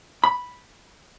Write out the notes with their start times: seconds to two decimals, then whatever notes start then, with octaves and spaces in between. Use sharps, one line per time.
0.24 B5